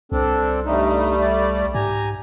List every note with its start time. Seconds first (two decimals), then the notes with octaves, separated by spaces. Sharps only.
0.12 C2 C4 D4 A4
0.66 G2 G3 A3 D#4
1.21 D5
1.74 G#2 G4 G#5 A#5